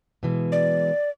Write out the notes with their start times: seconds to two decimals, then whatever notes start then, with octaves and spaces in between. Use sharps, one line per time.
0.23 B2 E3 G#3
0.52 D5